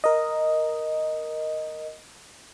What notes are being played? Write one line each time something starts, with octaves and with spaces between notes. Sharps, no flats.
A#4 D#5